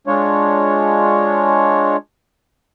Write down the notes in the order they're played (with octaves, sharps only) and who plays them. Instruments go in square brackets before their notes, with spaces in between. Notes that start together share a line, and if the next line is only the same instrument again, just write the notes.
[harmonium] G#3 D4 F4 C#5